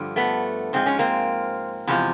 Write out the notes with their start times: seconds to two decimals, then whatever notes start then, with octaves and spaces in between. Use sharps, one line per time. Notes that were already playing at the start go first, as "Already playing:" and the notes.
Already playing: G2 D3 F3
0.16 A3 B3
0.73 G#2 F3 G#3 C4
0.86 C#4
0.99 A#3 C4
1.87 E2 C3 F3 G#3